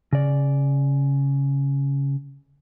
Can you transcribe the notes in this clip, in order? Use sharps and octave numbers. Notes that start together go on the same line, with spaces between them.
C#3 D5